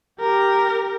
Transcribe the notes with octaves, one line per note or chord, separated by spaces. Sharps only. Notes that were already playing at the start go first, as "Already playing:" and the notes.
G4 A#4